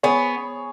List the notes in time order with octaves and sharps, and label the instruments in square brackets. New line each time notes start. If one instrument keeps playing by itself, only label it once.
[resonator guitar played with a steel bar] B3 [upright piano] G#4 C#5